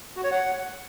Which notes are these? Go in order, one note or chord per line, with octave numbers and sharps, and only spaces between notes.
F#4
C#5
F#5